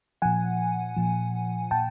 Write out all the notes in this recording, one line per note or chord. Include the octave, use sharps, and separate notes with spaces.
A#2 F3 F#5 G#5
A#2 F3
A#2 G5 A5